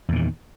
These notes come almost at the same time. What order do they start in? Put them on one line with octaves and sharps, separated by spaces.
E2 A#2 D#3